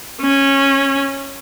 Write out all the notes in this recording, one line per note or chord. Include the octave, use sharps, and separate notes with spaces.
C#4